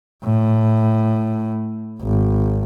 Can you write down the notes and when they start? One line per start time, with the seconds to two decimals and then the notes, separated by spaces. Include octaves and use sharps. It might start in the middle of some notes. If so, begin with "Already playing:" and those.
0.24 A2
2.02 G#1